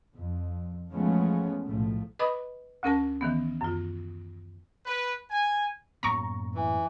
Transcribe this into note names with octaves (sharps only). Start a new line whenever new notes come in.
F2
E3 F3 G#3 A3 B3 C#4
B1 A2 F3 A3
B4 D#5 B5 D6 D#6
D2 C#4 A#4 A5
D#3 E3 B3
F#2 F4
B4
G#5
F#2 A2 A#3 B3 A#5 C#6
E3